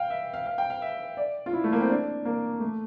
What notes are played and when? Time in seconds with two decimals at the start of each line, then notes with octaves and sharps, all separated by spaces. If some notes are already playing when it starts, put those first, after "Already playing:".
Already playing: F5 G5
0.10 E5
0.34 F5
0.46 F5
0.58 G5
0.70 F5
0.82 E5
1.17 D5
1.46 F4
1.53 E4
1.64 A3
1.73 A#3
1.81 C4
1.89 D4
2.25 A#3
2.60 A3